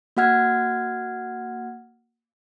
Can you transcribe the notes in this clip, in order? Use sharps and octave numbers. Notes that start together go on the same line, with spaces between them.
A#3 F#4 F#5 F6 G#6